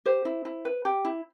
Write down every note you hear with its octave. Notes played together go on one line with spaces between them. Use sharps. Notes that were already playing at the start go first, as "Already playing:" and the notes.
G4 C5
E4
E4
B4
G4
E4